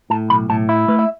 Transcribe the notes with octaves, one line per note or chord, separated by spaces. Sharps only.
A2 A5
B1 B5
A2 A5
E4 E5
A3 B4
E5